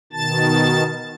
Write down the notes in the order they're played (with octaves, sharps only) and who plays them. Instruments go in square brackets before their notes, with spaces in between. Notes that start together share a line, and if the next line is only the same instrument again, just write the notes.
[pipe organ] B2 D#3 A5 A6